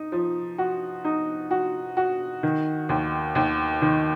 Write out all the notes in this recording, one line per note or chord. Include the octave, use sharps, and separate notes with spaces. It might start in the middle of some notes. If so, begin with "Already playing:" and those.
Already playing: D#4
F3
F#4
D#4
F#4
F#4
D#3
D#2
D#2
D#3